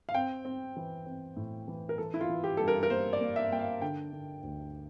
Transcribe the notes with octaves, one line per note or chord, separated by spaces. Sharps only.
F5
C4 G5
C4
E3
C4
A2
E3
A#4
E3 A4
E4
F4
E3
G4
G2 A4
A#4
A#4
A#3 C5
D5
A#3
E5
A#3 G5
F5
D3 G5
D3
D2